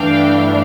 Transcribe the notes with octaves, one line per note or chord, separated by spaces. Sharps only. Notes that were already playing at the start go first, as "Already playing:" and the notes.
Already playing: G2 E3 A3 D4 F5 G5